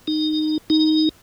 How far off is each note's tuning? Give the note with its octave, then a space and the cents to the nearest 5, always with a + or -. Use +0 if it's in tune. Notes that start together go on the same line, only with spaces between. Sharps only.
D#4 -15
D#4 +5